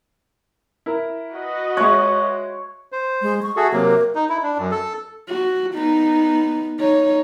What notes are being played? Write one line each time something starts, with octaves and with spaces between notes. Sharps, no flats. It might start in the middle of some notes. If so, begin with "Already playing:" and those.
E4 A#4
F#4 B4 D#5
G#3 C#5 E5 F#6
C5
G#3
C#6
F#4 G#4 A4 E5
C3 F#3 A#3 A#4
D#4
E4
D4
F#2
A4
F#4
B3 D#4
D#4 C#5